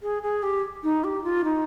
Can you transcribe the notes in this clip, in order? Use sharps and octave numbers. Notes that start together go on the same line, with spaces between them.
G#4
G#4
G4
D#4
G4
F4
D#4